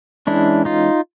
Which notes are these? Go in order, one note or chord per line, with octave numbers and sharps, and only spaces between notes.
E3 G#3 C#4 D4 E4
D#4 F4